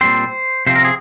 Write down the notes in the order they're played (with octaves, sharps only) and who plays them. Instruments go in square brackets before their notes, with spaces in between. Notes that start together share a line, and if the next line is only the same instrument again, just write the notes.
[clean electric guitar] A#2 G3 C4 C5
C3 F3 C4 C5
A#4
G#4